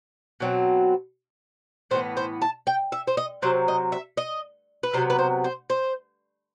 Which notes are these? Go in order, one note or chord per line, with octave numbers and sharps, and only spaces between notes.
B2 F#3 C4
A2 E3 B3 C5
C5
A5
G5
E5
C5
D#5
C3 F#3 C4 C5
D#5
E5
D#5
B4
C3 F#3 B3 C5
B4
C5
C5
C5